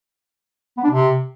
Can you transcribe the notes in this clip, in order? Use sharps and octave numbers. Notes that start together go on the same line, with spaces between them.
B3
D4
C3